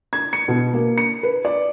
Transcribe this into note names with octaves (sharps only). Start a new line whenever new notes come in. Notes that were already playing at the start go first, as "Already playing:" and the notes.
G#6
C#7
B2
A#3
C#7
B4
D5